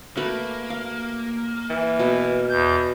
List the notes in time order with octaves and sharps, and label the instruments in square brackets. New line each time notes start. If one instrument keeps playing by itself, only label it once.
[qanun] A3 F#4 B4 [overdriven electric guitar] A#3
[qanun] F5
[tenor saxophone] E3
[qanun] B2
[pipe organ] E2 G6